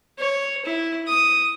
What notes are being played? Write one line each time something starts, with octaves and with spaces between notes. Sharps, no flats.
C#5
E4
D#6